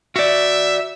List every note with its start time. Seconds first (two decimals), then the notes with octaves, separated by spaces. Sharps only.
0.16 F#4 D5 E5